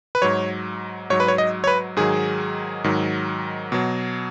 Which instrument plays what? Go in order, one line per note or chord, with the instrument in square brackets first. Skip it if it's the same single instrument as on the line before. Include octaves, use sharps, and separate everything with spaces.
[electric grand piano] B4
G#2 F#3 C#5
G#2 F#3 C#5
B4
C#5
D#5
C#5
B4
G#2 D#3 F#3 G#4
G#2 D#3 F#3
B2 F#3